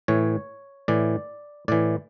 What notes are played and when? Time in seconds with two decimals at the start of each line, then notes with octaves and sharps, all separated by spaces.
0.08 A2 E3 C#5
0.88 A2 E3 D5
1.68 A2 E3 D5